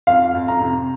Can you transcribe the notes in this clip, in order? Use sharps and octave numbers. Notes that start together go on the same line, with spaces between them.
F2 F5
F2
A#5
C3